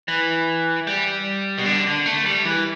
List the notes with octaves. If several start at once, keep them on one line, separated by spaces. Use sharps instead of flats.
E3
G3
B2
D3
D3
A3
G3
E3